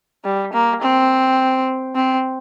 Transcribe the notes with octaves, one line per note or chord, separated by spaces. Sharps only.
G3
A#3
C4
C4